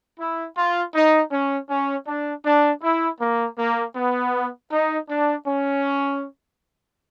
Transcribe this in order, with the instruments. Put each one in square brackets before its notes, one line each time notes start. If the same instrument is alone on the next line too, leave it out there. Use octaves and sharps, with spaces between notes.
[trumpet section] E4
F4
D#4
C#4
C#4
D4
D4
E4
A#3
A#3
B3
D#4
D4
C#4